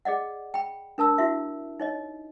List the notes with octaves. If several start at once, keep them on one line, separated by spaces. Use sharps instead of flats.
G#4 D5 D#5 F#5
G5 B5
D4 A#4 A5 E6
E4 F#4 E5
D#4 C#5 D#5